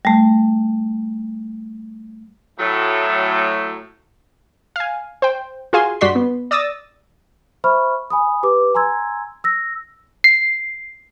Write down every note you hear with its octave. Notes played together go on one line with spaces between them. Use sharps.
G3 A3
A2 F#3 A3
F5 G#5
C5 G5
F4 F#4 G#4 F5 G#5 C6
G2 F#4 D5 C6 B6
B3
D5 D#6 E6 A6 A#6
C5 E5 B5 C#6 F6
G#5 B5 D#6
G4 B4 D6
G#5 A#5 C6 E6 G#6
E6 A#6
C7